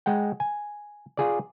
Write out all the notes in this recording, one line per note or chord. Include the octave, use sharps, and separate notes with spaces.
G#3 F#5 G5
G#5
F4 G#4 D5